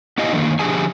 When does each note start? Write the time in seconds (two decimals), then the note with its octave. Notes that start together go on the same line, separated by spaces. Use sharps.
0.18 B3 E4 G4 D#5 F5 G#5
0.33 D3 D#3 A#3
0.59 D3 F3 G4 G#4 G#5